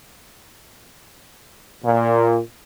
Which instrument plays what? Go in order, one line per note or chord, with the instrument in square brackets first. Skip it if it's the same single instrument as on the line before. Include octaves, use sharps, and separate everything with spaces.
[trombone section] A#2